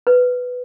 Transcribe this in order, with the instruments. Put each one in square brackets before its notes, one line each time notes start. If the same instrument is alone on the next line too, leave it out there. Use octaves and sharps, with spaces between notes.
[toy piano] B4